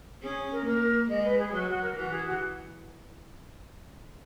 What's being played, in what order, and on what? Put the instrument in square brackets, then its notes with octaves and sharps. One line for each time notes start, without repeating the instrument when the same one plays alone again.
[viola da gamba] C#4 [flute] G#4
[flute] A#4
[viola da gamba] A#3 [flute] A#4
[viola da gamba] G#3 [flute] D#5
[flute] B4
G#4
[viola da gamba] F#3 [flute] F#4
[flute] F#4
A#4
[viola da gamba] E3 [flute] F#4
[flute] G#4
F#4